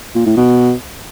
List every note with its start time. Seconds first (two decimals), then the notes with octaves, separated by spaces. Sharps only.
0.15 A#2
0.26 A2
0.37 B2